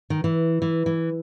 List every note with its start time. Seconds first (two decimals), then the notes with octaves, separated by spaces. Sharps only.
0.10 D#3
0.24 E3
0.62 E3
0.86 E3